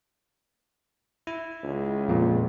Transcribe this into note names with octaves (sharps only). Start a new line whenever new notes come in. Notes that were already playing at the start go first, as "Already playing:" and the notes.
E4
C#2
F2 A#2